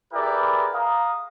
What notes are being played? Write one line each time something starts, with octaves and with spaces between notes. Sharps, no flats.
E4 G4 G#4 A#4 B4 D5
F5 A#5 D#6